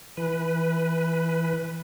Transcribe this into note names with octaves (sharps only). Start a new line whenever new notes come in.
E3 B4